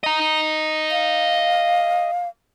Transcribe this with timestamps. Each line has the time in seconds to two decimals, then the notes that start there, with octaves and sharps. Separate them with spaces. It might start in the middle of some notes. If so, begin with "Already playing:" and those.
0.04 D#5 A#5
0.91 F5